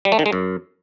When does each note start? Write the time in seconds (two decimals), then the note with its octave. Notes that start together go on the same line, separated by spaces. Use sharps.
0.05 G3
0.12 A3
0.19 D#3
0.26 G#3
0.33 F#2